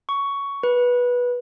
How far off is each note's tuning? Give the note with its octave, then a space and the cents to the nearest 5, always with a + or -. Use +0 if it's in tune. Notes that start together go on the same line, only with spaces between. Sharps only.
C#6 +10
B4 -15